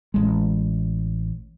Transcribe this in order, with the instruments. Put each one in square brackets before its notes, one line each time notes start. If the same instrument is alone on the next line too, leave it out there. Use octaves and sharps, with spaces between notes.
[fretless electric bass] A1 G#3